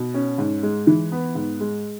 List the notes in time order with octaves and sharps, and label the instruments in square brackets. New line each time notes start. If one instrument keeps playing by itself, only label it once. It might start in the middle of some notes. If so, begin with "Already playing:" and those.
Already playing: [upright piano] B2
C#4
G#2
G#3
E3
B3
G#2
G#3